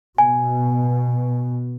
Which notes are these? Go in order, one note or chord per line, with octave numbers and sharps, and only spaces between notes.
B2 G#5